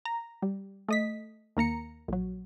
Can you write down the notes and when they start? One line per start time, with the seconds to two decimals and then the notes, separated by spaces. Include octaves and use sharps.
0.05 A#5
0.42 G3
0.88 A3 D#5 B6
1.57 D#2 A#3 A#5 C#7
2.08 A#1 F#3